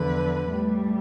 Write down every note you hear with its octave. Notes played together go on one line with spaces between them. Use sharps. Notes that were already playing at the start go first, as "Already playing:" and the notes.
Already playing: E2 D3 F3 B4
A2 G3